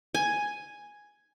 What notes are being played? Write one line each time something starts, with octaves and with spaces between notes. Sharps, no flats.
G#5